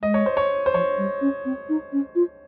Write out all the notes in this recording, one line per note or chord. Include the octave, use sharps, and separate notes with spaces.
G#3 D#5
C#5
C5
C#5
C5
F3 C#5
G3
C#4
C4
D#4
C#4
F4